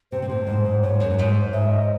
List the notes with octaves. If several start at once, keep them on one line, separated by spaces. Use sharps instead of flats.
C3 C5
C3
A2
G#2
G#2
G#2 C#5
F#2
F#2
G#2
G#2 E5
D#5